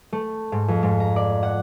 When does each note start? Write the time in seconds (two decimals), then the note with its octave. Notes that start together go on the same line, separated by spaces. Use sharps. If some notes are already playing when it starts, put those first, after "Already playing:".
0.13 A3
0.52 G#2
0.68 F2
0.83 G#2
1.00 A#5
1.16 D5
1.43 F#5